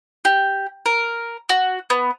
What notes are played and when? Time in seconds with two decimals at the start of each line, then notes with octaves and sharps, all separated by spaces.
0.25 G4
0.86 A#4
1.49 F#4
1.90 B3